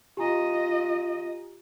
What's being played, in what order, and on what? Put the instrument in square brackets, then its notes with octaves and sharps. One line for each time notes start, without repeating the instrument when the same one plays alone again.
[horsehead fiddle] F4 D#5 [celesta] G4 G#5 A#5